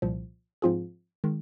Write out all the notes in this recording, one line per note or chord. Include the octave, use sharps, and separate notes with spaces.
C2 A#2 F3
G#2 F3 C4 F4 G#4
D#3 G#3